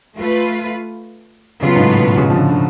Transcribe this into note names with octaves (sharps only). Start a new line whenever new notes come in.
A3 F4 B4
C#3 F#3 B3 F4 B4
G#2
A2
B2
C#3
F3
D3
D3